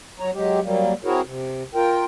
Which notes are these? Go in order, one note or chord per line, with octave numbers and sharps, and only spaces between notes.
F#3 C#5 A#5
F#3 G#3 G4
F#3 G3 A#3
C4 E4 F#4 G#4 A#4 C#5
C3
F4 A#4 G5